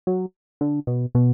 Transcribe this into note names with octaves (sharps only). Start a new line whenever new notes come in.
F#3
D3
B2
B2